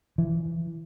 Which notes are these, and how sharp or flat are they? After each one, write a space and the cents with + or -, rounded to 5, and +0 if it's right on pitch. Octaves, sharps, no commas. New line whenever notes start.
E3 +15